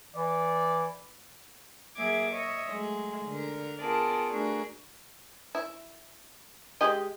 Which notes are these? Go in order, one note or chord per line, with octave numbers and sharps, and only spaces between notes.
E3 D5
F#3 A#3 G#4 E5 D6 G#6
C#5 D#5 E5
F#3 G#3 A3
D3 A#4
B3 F4 G#4 A#4 D5 A5
A3 D4 F#4 G#4 A#4
E4
G#3 G4 D#5